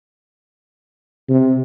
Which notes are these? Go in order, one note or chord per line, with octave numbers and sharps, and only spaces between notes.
C3